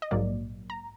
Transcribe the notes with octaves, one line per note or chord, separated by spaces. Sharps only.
D#5
A#1 G#2 F#3 A#3 D5
A#5